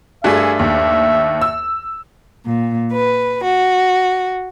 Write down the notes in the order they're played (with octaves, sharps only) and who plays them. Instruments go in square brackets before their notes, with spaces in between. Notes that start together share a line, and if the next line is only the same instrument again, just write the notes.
[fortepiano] G2 A3 [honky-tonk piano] F#4 G#4 [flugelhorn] E5
[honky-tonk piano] D#2
E6
[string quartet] A#2
B4
F#4